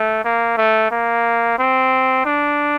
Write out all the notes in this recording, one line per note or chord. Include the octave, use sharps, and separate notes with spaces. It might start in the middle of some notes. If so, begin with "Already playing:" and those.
Already playing: A3
A#3
A3
A#3
C4
D4